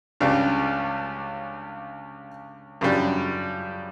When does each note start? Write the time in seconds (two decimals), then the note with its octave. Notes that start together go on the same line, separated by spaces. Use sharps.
0.20 C#2 C#3 G3 D4
2.81 F#2 C#3 G3 D4